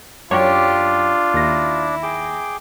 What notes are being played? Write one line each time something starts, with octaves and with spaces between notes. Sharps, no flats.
F#2 D4 F4 G4 C#5
D#2 E4 A#6
G#4 G5 D6